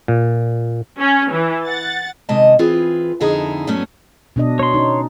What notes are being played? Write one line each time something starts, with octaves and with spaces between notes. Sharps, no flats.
A#2
C#4
E3
F#5 A6
C3 D#3 G#3 D#5 A5
E3 C4 F4 G#4 B4
F2 D3 D#4 E4 G#4 A#5
G2 F#3 A3 B3 C#4
B2 D4 D#5
C#5 C6
C#4 D#4